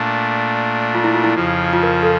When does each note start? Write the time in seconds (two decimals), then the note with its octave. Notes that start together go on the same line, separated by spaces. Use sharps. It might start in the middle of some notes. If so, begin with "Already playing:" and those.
Already playing: A#2 A3 D4
0.95 F4
1.04 E4
1.14 F4
1.24 E4
1.34 F2 C#3 F3
1.73 F4
1.83 A#4
2.03 A4